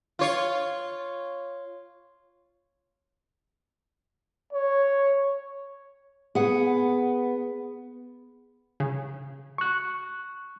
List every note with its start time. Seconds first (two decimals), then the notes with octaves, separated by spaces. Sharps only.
0.19 F4 C#5
4.53 C#5
6.35 B3 G#4 F#5
8.80 C#3
9.58 C#6 F#6